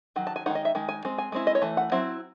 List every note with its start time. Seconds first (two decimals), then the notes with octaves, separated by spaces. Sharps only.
0.16 D#3 F#3
0.27 A5
0.36 G#5
0.46 D#3 G#3 D#4 F#5
0.55 D#5
0.65 E5
0.75 D#3 G#3
0.89 G#5
1.05 G#3 C4
1.18 G#5
1.32 G#3 C4 E4
1.47 D#5
1.55 C#5
1.62 E3 A3
1.77 F#5
1.92 F#3 C4 E4